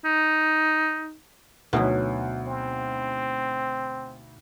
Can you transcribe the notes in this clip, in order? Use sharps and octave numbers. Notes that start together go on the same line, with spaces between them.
D#4
D2 B2 F#3 D#4 E4
C4